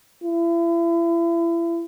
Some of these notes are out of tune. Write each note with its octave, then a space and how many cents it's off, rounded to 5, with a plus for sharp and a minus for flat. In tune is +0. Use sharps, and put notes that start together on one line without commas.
E4 +35